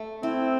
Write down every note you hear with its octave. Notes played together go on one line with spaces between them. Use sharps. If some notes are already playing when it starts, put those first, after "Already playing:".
Already playing: A3
C4 E4